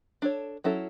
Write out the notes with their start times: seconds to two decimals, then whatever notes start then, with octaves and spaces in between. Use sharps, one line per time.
0.22 D4 A4 C#5
0.64 F#3 C#4 E4 A4